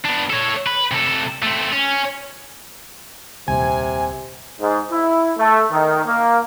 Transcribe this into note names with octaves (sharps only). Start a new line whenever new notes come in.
B3 D4
A4 C#5
B4
C3 A4
A3 C4
C#4
D#1 C2 C3 G#5
G#2
E4
A3
D#3
A#3